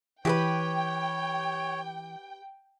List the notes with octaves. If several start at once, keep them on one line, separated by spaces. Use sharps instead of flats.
E3 G4 G#4 B4 C#5 G5